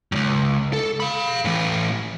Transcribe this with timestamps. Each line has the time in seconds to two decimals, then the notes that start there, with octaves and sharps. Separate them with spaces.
0.12 C#2 F#2
0.73 A4
1.00 F5 B5
1.45 A2 E3